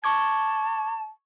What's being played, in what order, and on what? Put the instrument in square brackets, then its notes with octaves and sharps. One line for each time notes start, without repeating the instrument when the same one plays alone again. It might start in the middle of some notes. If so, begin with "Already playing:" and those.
[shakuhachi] A5 [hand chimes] C#6 D6 G#6